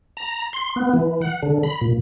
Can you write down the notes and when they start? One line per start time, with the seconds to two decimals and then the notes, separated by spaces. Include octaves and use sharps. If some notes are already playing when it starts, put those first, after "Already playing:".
0.17 A#5
0.53 C6
0.76 B3
0.94 E3
1.22 F#5
1.43 D3
1.63 B5
1.81 A#2